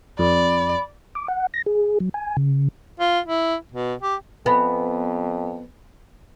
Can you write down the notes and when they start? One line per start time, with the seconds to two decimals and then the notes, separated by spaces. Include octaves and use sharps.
0.19 F2 D5 B5
1.15 D6
1.28 F#5
1.54 A#6
1.66 G#4
2.00 F#3
2.14 G#5
2.37 C#3
3.00 F4
3.26 E4
3.72 B2
4.02 G4
4.46 F2 B3 E5 G#5 B5